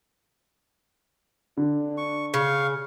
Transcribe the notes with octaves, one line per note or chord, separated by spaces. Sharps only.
D3 D4
C#6
C#3 F5 C#6